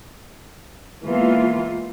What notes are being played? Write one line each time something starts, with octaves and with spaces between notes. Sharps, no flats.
E3 G#3 A#3 B3 F4